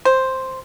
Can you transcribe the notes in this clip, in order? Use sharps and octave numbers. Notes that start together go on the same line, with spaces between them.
C5